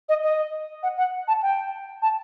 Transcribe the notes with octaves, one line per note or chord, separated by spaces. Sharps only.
D#5
D#5
F#5
F#5
A5
G5
A5